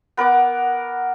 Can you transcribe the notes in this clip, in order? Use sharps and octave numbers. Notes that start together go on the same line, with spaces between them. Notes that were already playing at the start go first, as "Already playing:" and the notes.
B3 A#4 F#5 D6